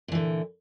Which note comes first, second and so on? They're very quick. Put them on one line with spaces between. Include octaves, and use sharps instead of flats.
A#2 E3 D3